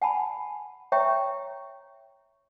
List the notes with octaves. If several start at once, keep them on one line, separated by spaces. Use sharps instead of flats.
F#5 G#5 A5 B5
C#5 E5 G5 A#5 C#6